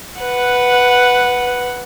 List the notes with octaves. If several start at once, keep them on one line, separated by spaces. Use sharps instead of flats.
B4 F#5